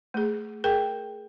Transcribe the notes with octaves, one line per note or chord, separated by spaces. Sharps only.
A3 G#4
G#4 A#4 G5